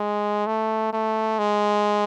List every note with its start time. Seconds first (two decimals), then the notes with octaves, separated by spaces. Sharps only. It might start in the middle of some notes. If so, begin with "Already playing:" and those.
Already playing: G#3
0.46 A3
0.93 A3
1.39 G#3